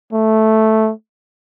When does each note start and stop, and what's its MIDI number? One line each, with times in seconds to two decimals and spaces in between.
0.13 0.91 57